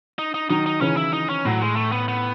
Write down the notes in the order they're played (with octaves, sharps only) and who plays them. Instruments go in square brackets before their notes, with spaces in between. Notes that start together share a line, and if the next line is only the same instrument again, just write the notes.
[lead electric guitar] D#4
D#4
[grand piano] D#3 F#3 [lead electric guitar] D#4
[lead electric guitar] D#4
[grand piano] C#3 E3 [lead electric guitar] C#4
[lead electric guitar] E4
D#4
C#4
[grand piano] A2 [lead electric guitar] F#3
[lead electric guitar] G#3
A3
B3
B3